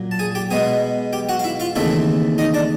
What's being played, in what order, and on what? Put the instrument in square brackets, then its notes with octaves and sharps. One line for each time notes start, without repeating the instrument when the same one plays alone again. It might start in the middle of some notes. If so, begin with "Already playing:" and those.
Already playing: [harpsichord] A#2 F#3 A#3
A5
G#4 G#5
G4 G5
B2 G#3 B3 G#4 G#5
G4 G5
F#4 F#5
F5
E4 E5
F4 F5
D#2 C#3 E3 A3 C4 E4 E5
D#4 D#5
D4 D5